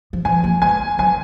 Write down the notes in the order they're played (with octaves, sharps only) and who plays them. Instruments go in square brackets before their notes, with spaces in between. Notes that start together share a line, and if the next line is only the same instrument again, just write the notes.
[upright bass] F3
[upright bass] F3 [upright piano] G#5
[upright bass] A#3
[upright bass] G#3 [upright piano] G#5
[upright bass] F#3 [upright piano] G#5